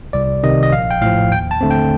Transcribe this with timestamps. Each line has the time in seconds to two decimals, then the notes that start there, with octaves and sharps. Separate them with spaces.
0.13 C2 D5
0.43 C3 D#3 D#5
0.63 D#5
0.72 A#1 F5
0.91 G5
1.01 A2 F3 F5
1.31 D#2 G5
1.51 A5
1.61 D3 A3 C4
1.71 G5